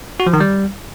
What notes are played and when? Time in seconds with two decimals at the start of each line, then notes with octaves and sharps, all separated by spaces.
0.20 F#4
0.27 F3
0.33 D#3
0.40 G3